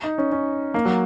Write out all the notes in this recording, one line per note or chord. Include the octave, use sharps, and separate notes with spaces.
D#4
C#4
C#4
A#3
F#3